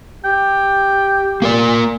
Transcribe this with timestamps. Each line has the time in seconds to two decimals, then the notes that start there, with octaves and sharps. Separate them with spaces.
0.25 G4 G5
1.42 A#3 A#4 D5